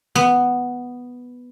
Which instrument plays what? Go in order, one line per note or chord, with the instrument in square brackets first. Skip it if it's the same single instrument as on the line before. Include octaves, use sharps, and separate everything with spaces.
[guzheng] B3